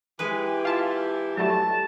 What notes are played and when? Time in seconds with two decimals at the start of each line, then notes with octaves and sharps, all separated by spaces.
0.19 E3 G#3 G4 G#4 B4
0.65 F4 A5
1.37 F#3 G3 A3 A5